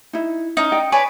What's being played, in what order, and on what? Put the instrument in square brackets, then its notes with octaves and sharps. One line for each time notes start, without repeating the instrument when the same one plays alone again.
[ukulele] D#4 E4
[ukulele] C#4 [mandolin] D#4
[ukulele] D5 D#5 G5
[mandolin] B4 C#5 D5 [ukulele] G#5 A5